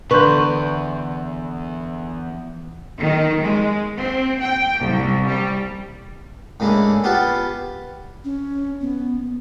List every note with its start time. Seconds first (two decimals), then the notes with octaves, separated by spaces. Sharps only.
0.11 E2 D3 B4 C6 C#6 G6
3.01 D#3
3.43 G#3
3.97 C4
4.41 G5
4.81 C2
5.27 G3
6.60 A2 C#3 G#3 A#3 D4 E4
7.04 B3 F4 G4 B4 F5 A5
8.25 C#4
8.81 B3